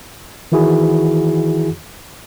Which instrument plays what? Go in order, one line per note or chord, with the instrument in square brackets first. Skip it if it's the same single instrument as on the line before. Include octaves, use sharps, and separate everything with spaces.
[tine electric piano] D#3 E3 E4 F#4 G#4